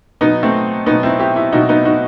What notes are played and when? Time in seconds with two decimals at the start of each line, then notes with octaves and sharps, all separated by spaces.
0.21 B2 F#3 B3 D#4
0.43 A3 C4
0.86 B2 F#3 B3 D#4
1.03 C4 E4
1.19 E4 G4
1.36 E4 G4
1.52 B2 F#3 D#4 F#4
1.69 B3 D#4
1.85 D#4 F#4